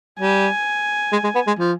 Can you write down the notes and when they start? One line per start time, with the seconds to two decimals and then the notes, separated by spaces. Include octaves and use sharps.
0.20 G3 G#5
1.12 G#3
1.24 G#3
1.35 B3
1.47 G#3
1.59 F3